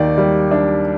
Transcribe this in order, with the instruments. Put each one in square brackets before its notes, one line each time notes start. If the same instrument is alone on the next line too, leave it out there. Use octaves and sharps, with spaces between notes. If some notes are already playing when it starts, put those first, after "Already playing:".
Already playing: [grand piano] D#2 D#3 [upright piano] D5
[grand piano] G3
D4